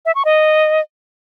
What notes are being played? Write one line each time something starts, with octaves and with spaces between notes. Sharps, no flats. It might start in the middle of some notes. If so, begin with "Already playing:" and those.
E5
C#6
D#5